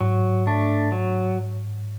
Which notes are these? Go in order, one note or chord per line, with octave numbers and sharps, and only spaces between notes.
G#2 F#3
A3 D4
F#3